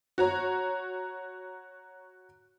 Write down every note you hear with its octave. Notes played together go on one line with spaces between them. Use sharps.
F#4 C#5 A#5